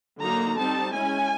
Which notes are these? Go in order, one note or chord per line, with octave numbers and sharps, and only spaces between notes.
D3 F#3 A#3 D#4 A#5
G3 C4 D#4 A5
G#3 C#4 E4 G#5